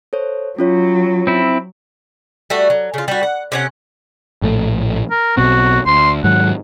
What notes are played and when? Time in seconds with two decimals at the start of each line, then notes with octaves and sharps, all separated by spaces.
0.13 A4 C5 C#5
0.59 F#3 C#4 F4 C#5
1.27 C4 E4
2.50 G3 A3 F#4
2.70 F#3
2.94 C#3 F4
3.08 G3 F#4
3.23 F#5
3.52 C3 C#4 F#5
4.42 A#1 A2 A3
5.11 A#4
5.37 B1 B2 C4 F#4
5.86 D2 C6
6.24 G#2 D#3 F#3 F#5